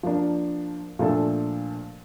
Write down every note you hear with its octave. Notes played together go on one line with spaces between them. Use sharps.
F3 A#3 D4
A#2 F3 A3 D4 A4